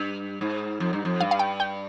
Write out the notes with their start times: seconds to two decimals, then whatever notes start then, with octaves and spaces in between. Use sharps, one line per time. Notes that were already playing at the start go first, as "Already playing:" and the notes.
Already playing: G2
0.41 G#2
0.80 F2
0.93 G2
1.05 F2
1.20 G2 F5
1.31 F5
1.39 G5
1.60 G5